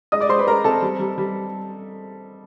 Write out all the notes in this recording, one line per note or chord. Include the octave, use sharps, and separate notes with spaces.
G#3 D#5 D#6
D5 D6
G#3 C5 C6
B4 B5
G#3 A#4 A#5
C4 A4 A5
G3
G3
G3